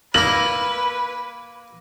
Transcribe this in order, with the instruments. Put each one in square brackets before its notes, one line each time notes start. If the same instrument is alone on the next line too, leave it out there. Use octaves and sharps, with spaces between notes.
[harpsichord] A#3 E4 [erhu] B4 [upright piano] F#7